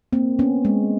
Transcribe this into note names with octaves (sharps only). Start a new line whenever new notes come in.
A#3 C4
B3 C#4
G#3